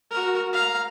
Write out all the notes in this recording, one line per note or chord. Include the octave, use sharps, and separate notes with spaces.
F#4 A#4
F5 A#5